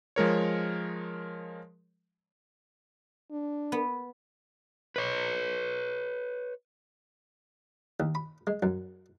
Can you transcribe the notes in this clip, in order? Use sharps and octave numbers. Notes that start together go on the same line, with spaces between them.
F3 G#3 A#4 C#5
D4
B3
B4 C#5
D#2
B5
G#3
F#2